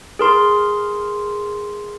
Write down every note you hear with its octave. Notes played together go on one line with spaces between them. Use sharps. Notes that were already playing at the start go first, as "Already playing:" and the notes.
G#4 A#4 C6